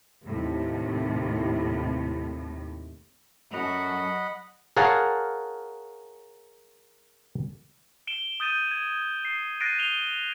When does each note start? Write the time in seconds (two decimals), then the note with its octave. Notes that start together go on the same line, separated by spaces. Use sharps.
0.24 D#2 A2 C3
3.53 F#2 F#3 F#4 A4 D#5 F#5 B5
4.77 G#4 A#4 C#5 F5 F#5 A5
8.07 D7 E7 G7
8.40 D#6 G6 A6 D#7 E7
8.71 G#6
9.25 C7
9.60 F#6 A6 A#6 C7 D7 D#7
9.77 C7 D7 E7 F7 G7